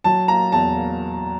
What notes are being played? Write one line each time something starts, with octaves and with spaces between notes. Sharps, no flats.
F#3 A5
A#3 A#5
E2 A5
A#3